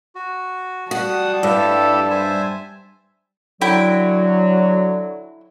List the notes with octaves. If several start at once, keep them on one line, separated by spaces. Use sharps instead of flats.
F#4
G3 F#4 F#5 A5 D#6
G2 E4 G4 A4
C5 E5 G#5
D3 F#3 E4 G5